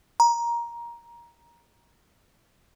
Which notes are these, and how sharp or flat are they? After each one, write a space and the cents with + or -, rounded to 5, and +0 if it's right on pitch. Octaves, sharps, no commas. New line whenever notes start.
A#5 +15